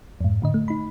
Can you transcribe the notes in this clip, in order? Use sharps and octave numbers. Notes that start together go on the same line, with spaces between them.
F2 G#2
A2 D3 D#5
A3
D#4 B5